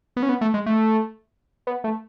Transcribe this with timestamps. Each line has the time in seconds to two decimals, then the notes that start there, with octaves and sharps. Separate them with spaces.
0.17 B3
0.23 C#4
0.29 B3
0.41 A3
0.54 G#3
0.66 A3
1.67 B3
1.84 A3